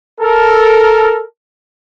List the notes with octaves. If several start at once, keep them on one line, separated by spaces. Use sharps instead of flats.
A4 A#4